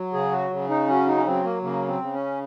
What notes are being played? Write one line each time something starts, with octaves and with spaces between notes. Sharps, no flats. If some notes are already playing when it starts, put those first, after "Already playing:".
Already playing: F#3
C#3 G#4
F#4
C#3
D#4
F#3 C#4
D#4
C#4
F#3 C4
A#3
C#3 A#3
C4
C#3
C#4